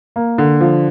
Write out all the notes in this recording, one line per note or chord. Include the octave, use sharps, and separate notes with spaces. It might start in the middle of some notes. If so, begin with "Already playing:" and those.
A#3
D3
F3